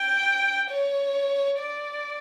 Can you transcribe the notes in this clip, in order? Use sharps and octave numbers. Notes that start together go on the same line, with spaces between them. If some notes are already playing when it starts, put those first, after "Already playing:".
Already playing: G5
C#5
D5